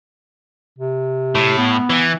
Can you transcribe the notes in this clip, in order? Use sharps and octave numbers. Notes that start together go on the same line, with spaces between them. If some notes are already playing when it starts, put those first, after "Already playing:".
C3
A2
B3
E3